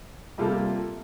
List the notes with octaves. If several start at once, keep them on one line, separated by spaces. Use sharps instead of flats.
C3 G3 A#3 F4 A4